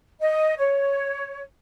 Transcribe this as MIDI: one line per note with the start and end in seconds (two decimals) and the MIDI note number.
0.21 0.53 75
0.58 1.41 73